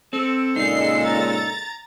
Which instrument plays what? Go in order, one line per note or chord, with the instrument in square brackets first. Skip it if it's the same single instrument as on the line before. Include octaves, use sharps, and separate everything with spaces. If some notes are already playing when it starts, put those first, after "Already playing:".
[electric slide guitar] C4 [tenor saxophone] A4
[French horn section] A#2 C#3 G#3 [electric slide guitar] D#4 [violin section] C7
[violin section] A#5 A6